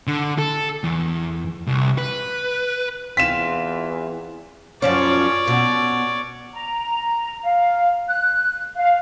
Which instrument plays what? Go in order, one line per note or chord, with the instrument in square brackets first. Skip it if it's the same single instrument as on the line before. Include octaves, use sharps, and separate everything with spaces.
[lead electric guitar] D3
A4
E2
C2
B4
[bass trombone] E2 [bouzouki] C4 F4 [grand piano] B6 E7
[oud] F#2 F3 C#4 [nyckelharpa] C#5 D5
[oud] B2
[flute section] A#5
F5
F#6
F5